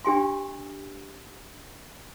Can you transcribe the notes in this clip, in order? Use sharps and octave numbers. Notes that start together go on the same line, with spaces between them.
D4 G4 G#5 C6